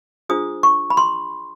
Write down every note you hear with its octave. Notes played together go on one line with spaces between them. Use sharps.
D4 F4 G#4 C5 D#6
C#6
B5
C6